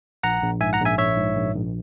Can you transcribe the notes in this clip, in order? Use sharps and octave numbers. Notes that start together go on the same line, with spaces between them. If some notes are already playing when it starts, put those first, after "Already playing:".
A#1 F#5 A#5
A#1
G#2 E5 G#5
F#5 A#5
A#1
E5 G#5
A#1 C#5 E5
G#2
A#1
A#1